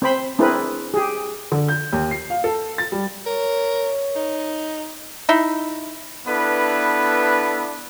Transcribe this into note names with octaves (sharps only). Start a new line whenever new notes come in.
C4 C5 B5
C4 D4 E4 G#4 A#4 B4
G4 G#4
D3
G6
D#2
C7
F5
A4
A6
G3
A#4 C#5
D#4
D#4 E4
B3 D4 E4 A4 B4